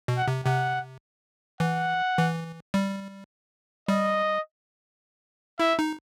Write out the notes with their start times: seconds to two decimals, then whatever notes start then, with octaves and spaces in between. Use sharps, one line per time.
0.08 B2
0.18 F#5
0.28 C3
0.46 C3 F#5
1.60 E3 F#5
2.18 E3
2.74 G3
3.88 G3 D#5
5.59 E4 E5
5.79 D#4